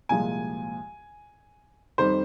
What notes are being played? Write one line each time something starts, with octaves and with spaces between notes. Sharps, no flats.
C2 A#2 F3 G#3 G#5
F2 D#3 G3 C5